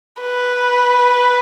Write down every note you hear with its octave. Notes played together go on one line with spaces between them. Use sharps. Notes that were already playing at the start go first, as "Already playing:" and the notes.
B4